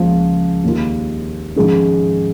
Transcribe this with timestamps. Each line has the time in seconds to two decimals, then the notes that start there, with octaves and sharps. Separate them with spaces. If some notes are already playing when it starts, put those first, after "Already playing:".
Already playing: C#2 C#3 F3 A#3
0.64 D#2 D#3 A#3 F4
1.56 G#1 G#2 F3 G#3 C#4